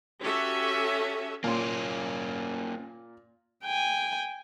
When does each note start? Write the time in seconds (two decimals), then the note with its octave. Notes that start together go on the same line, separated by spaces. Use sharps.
0.21 C#4 F#4 G4 A4 E5
1.44 A#2 A#3 C#4 C6
3.64 G5 G#5